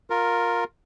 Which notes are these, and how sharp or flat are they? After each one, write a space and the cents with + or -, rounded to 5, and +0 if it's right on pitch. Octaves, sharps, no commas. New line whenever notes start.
F4 +15 A#4 +0